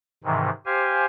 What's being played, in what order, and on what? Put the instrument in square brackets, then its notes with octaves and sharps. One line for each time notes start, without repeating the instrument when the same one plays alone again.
[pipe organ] G#2 C3 D#3 E3
G4 C5 F5 G#5